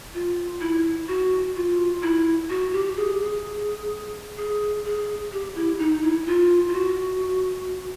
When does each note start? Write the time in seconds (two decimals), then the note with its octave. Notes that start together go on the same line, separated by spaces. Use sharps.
0.14 F4
0.61 E4
1.08 F#4
1.56 F4
2.03 E4
2.50 F#4
2.73 G4
2.97 G#4
3.20 G#4
4.37 G#4
4.85 G#4
5.32 G4
5.55 E4
5.79 D#4
6.03 E4
6.27 F4
6.68 F4
6.73 F#4